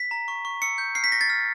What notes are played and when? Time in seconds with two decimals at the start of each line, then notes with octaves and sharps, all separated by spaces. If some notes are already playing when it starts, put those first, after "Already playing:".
Already playing: B6
0.11 A#5
0.28 C#6
0.45 C#6
0.62 E6 C#7
0.78 G6
0.95 F6 C7
1.04 B6
1.12 C#6 A#6
1.21 A6
1.30 F6